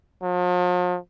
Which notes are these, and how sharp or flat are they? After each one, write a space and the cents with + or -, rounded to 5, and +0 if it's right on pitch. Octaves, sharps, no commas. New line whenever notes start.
F3 +45